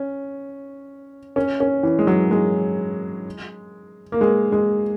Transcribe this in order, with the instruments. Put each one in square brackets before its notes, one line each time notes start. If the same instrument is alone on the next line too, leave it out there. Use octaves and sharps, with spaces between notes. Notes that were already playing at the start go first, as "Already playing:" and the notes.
Already playing: [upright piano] C#4
C#4
C#4
E3
G#3
F#3
G#3
A#3
G#3
G#3